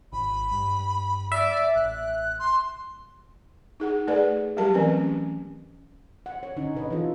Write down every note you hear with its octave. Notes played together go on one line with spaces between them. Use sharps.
G#1 B5
G2
D5 E5
A1 F#6
C6
D#4 G#4 F#5
A3 G#4 A4 B4 D5 F#5
F#3 G3 G4 A#4 A5
E3 A3 C4 C#4 B4 G#5
C#4
F#5
C#5
D3 C#4 D#4
C3 B4 D#5
E3 D#4 F4 A4